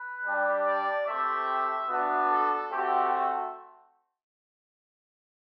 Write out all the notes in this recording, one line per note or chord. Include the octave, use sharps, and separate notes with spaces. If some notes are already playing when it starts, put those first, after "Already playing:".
Already playing: B4
G3 D4 G4
D5
A3 C4 G4 E5
B3 D4 F#4
A4
A3 C4 F#4 G4